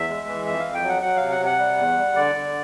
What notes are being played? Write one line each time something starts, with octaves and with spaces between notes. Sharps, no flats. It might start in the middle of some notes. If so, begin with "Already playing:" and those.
Already playing: E2 E5
G#3
E3
F2 E5
F5
F2
G5
F#3 F#5
F#3 F#5
C3 F5
F#5
C3
F#5
G3
E2
G3
D3 D5
D3